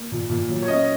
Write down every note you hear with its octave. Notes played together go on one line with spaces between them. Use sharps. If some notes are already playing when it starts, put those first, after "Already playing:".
Already playing: A#3
A#2
A#2
F#3
C#5
C#4 D#5